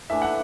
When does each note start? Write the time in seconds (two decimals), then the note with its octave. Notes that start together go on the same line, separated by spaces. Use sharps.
0.10 A2 E3 A3 D4 E5
0.22 F#5